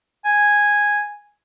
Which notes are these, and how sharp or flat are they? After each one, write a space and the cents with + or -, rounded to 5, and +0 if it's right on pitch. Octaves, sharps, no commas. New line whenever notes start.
G#5 -5